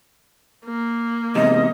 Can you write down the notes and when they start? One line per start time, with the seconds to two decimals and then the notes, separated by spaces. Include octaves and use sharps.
0.66 A#3
1.35 E2 G#2 C3 D#5